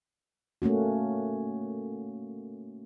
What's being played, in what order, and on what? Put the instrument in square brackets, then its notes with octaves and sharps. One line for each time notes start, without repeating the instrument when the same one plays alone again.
[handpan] A3 A#3 C#4 F#4